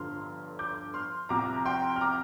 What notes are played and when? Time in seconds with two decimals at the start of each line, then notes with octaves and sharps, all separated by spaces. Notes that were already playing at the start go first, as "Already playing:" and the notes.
Already playing: G1 G2 D3 F3 C6 F6
0.59 D6 G6
0.94 C6 F6
1.29 C2 C3 F3 A#5 D6
1.66 G5 C6
1.96 F6
2.01 A#5 D6